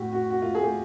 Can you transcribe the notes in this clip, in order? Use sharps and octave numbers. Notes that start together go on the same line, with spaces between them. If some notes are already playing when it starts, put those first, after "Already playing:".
Already playing: A2 F#4 G4
F#4
F#4
F4
G#4
G4